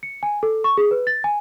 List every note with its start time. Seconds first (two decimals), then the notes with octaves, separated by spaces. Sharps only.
0.03 C#7
0.23 G#5
0.43 A4
0.64 C#6
0.77 G#4
0.91 B4
1.07 A6
1.24 G#5